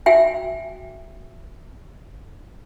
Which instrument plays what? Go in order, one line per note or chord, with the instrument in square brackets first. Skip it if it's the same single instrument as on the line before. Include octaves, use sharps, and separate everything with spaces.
[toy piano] F#4 E5 G5 G#5